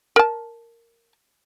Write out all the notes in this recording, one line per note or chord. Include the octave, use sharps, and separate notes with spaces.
A#4 A5